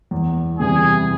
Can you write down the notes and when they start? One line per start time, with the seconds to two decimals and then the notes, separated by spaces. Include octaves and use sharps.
0.11 E2
0.59 C3 E3 G3 G#4